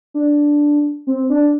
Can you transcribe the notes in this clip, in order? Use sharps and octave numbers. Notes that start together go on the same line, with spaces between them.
D4
C4
D4